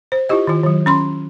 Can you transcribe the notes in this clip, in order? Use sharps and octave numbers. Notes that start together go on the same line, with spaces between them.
C5
E4 F4 G4 D#5
D#3 F4
D#3 F#3
C#4 B5 C6